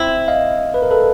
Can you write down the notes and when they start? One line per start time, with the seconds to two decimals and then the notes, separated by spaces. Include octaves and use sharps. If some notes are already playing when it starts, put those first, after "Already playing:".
Already playing: C4 E4
0.28 D#5 F5
0.74 B4
0.82 A#4
0.91 A4 B4